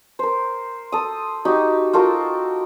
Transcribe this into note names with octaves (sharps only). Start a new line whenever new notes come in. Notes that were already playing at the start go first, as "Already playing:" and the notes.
A#4 C5
A4 D#6
D#4 F#4 G4
F4 F#4 A4 A#4